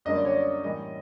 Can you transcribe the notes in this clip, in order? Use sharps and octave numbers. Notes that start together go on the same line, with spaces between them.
F#2 D3 G3 A#3 D#5
D5
C#5
D5
A2 E3 G3 A#3 D#5